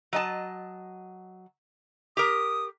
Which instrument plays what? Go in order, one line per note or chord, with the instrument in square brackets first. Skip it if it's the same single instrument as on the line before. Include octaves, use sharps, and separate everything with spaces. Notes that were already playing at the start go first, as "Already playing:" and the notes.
[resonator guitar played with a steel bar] F#3 D#5 A5
[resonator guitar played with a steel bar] G4 A#4 [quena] D#6